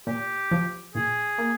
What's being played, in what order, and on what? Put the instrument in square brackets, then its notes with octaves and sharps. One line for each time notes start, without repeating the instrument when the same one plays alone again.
[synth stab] A#2 [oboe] G4
[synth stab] F3
[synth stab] A#2 [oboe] G#4
[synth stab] A#3